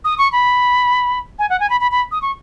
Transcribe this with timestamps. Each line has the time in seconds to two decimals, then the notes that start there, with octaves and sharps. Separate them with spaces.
0.04 D#6
0.18 C#6
0.32 B5
1.39 G#5
1.50 F#5
1.60 G#5
1.70 B5
1.80 B5
1.91 B5
2.12 D#6
2.22 C#6